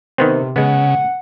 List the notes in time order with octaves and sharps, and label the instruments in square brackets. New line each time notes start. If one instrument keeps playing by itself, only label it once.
[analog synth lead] C3 [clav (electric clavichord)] D#3 B3 C4
[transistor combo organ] C#3 [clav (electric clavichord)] G#3 B3 [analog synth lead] F#5